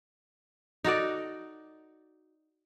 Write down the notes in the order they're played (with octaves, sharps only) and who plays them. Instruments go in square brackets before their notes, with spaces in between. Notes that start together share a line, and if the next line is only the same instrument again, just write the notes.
[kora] D#4 F#4 A4 D5